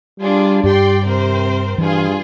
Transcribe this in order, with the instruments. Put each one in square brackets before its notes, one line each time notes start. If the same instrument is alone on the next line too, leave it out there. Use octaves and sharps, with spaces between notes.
[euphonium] G3 [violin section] D4 F4 G#4
[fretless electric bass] G2 [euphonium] G4 [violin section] D5 G5 C6
[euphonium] C3 [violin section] C4 A#4 C5
[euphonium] G2 [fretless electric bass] E3 G3 [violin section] F4 G#4